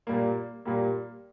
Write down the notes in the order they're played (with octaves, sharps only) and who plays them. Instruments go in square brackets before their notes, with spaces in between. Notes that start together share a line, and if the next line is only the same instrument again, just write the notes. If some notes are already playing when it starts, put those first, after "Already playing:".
[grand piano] A#2 G3 A#3
A#2 G3 A#3